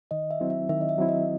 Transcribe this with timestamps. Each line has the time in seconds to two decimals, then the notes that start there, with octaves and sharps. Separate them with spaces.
0.11 D#3 D#5
0.31 E5
0.40 F#3 C4 E4
0.50 E5
0.69 D#3 E5
0.81 D#5
0.89 E5
0.98 F#3 C4 E4
1.09 D#5